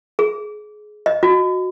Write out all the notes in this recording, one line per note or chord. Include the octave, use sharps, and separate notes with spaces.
G#4
D#5
F#4